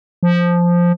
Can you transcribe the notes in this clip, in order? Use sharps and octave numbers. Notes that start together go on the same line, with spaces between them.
F3